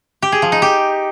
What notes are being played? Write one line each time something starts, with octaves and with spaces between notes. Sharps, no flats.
G4
G#4
F3
D#4
G4